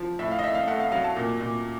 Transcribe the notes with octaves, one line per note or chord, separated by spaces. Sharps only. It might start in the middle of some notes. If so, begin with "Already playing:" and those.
Already playing: F3
A2 E5
F5
D#5
A2 E5
F5
A3 F#5
F5
F#3 F5
A5
A#2
A#2